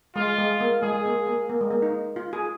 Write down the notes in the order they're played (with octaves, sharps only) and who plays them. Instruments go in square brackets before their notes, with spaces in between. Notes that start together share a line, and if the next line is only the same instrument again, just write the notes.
[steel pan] G#3 [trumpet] F4
[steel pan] G#3
A#3
[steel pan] G#3 [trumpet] G#4
[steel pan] A#3
A#3
A#3
G#3
A#3
D#4
F4
G#4